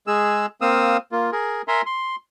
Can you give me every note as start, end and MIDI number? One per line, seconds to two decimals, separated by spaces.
0.07 0.46 56
0.07 0.46 68
0.07 0.46 88
0.61 0.97 58
0.61 0.97 60
0.61 0.97 77
0.61 0.97 87
0.61 0.97 88
1.12 1.31 58
1.12 1.31 65
1.32 1.62 68
1.32 1.62 70
1.68 1.82 70
1.68 1.82 76
1.68 1.82 80
1.68 1.82 82
1.68 1.82 84
1.86 2.16 84